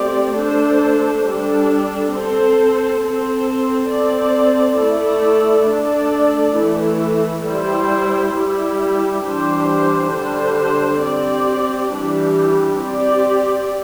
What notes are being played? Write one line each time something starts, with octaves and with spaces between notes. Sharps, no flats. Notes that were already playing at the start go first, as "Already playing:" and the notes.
Already playing: A3 C4 G4 D5
A3 D4 A4 C5
G3 D4 A4
C4 A4 C5
C4 A4 C5
C4 A4 D5
A3 E4 A4 D5
A3 D4 A4 D5
E3 A3 E4
G3 E4 C5
G3 E4 G4
E3 G3 D4 G4 C5
D3 G3 D4 C5
C4 G4 D5
E3 G3 D4 G4
C4 G4 D5